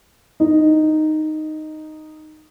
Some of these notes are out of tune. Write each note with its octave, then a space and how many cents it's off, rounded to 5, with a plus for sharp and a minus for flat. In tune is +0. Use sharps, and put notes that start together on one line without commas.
D#4 -5